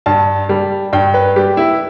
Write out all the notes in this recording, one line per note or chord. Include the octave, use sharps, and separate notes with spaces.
G2 A5
G3
G2 G5
B4
G3 G4
E4